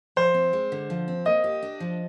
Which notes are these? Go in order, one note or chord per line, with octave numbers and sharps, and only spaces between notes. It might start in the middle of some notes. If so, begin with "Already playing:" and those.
F3 C5
C4
G#3
D3
F3
C4
A#3 D#5
G4
D4
F3